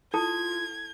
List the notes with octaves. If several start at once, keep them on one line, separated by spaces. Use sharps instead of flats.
E4 F4 A4 A5 G#6